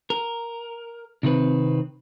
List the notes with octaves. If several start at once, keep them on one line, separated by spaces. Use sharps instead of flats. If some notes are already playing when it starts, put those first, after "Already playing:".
A#4
C3 D#3 C4 B4